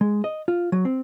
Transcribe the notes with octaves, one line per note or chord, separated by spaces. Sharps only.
G#3
D#5
F4
F#3
C4